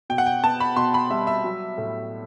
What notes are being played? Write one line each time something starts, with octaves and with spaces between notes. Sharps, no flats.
B2 G5
F#5
G5
B3 A5
B5
B2 C6
B5
G3 E5
E5
F#3
A2